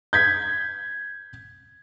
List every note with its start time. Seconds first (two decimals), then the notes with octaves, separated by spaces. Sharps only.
0.13 G6 G#6 B6